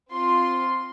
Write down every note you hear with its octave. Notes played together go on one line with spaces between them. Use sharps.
C4 F4 C6